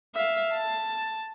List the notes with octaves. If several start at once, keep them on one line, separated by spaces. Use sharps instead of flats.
E5 F5
A5